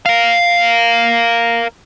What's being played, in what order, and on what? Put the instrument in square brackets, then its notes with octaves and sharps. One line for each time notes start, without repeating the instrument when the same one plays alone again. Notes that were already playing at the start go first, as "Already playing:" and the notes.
[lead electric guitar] A#4 F5